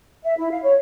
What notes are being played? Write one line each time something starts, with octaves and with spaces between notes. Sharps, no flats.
E5
E4
F5
C#5